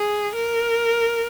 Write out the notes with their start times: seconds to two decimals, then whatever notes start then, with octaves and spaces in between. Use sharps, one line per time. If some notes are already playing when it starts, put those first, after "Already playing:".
Already playing: G#4
0.35 A#4